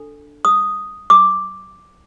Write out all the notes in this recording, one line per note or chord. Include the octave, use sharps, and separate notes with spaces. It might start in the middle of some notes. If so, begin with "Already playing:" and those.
Already playing: D4 A4
D#6
D6